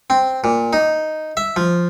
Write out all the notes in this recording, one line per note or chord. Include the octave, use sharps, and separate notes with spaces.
C4
A#2
D#4
E5
F3